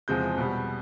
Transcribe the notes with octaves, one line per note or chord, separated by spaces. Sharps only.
E2 C3 F3 G#3 G6
B2 G3